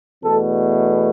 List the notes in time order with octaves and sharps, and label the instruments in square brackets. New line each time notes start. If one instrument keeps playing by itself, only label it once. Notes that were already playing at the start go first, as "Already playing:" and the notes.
[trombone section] E2 B2 A3 A4